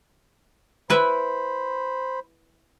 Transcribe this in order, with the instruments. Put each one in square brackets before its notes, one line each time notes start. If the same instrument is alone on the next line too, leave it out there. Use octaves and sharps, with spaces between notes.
[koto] E4 B4 E5 [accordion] C5 B5